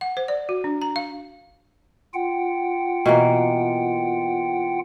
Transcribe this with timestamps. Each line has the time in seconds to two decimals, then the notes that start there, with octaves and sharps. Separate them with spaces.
0.01 F#5
0.17 C5
0.28 D5
0.49 F#4
0.64 D4
0.82 A#5
0.96 F5
2.14 F4 F#5 G5
3.06 B2 E3 A#3